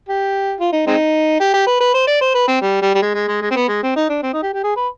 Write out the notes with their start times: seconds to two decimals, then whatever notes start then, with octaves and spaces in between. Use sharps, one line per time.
0.09 G4
0.60 F4
0.73 D#4
0.87 G#3 C4 D#4
1.40 G4
1.54 G4
1.67 B4
1.80 B4
1.94 C5
2.07 D5
2.21 C5
2.35 B4
2.48 C4
2.61 G3
2.82 G3
2.95 G3
3.02 G#3
3.15 G#3
3.28 G#3
3.41 G#3
3.51 C4
3.56 B3
3.68 G#3
3.83 C4
3.96 D#4
4.09 D4
4.22 C4
4.33 D#4
4.43 G4
4.53 G4
4.63 G#4
4.76 B4